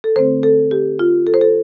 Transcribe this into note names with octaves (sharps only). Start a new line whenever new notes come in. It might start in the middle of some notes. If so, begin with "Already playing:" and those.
A4
D3 A3 C4 C5
A4
G4
F4
A4
C5
A4